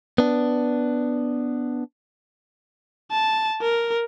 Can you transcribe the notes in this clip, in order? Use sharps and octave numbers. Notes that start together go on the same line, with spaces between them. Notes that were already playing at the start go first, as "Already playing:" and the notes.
B3 D4
A5
A#4